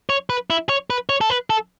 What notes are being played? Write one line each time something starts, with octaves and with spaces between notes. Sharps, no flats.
C#5
B4
E4
C#5
B4
C#5
A4
B4
A4